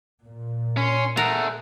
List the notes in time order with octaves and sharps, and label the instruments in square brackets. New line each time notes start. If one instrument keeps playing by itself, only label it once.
[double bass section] A#2
[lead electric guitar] C#4 [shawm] C6
[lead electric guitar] A3 G#4 [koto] A#4 [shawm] F#5